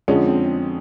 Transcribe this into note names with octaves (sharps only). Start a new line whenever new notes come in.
F2 D3 F3 G#3 C#4
C4